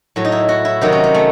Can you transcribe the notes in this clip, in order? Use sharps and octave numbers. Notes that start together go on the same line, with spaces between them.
A2 F#3
D#4
E4
F#4
E4
C3 D#3 F#3 D#4
C#4
C#4
A3